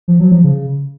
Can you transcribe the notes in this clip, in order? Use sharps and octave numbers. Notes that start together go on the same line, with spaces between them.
F3
F#3
F3
C#3